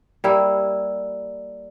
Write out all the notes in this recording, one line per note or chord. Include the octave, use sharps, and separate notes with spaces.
G3 A#3 E4